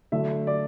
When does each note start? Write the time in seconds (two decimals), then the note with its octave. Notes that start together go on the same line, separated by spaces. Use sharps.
0.12 D3 F#3 A3 D4 E5
0.47 D5